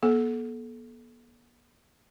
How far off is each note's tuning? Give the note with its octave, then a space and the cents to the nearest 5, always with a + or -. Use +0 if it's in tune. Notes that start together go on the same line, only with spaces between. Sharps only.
B3 -45 A4 -25